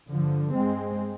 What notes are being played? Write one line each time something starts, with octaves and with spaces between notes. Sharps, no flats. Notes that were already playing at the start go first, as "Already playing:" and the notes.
G2 D3 F3
G#3 C4